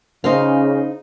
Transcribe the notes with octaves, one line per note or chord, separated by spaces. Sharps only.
C#3 D#4 C5 F5